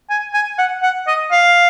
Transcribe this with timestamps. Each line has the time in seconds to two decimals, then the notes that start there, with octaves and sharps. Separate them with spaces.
0.10 G#5
0.34 G#5
0.58 F#5
0.83 F#5
1.07 D#5
1.31 F5